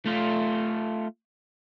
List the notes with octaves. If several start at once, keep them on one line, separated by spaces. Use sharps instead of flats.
A3 F4